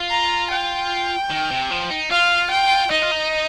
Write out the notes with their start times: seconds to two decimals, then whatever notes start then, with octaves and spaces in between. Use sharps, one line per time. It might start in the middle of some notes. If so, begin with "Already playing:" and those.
Already playing: F4
0.10 A#5
0.50 G5
1.30 D#3
1.51 C3
1.71 F3
1.90 D#4
2.11 F4 F5
2.51 G5
2.91 D#4 D#5
3.02 F4
3.11 D#4